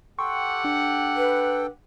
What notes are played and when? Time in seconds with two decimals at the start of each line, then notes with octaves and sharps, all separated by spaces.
0.19 G4 A4 F#5 G5 C6 C#6
0.65 D4
1.17 B4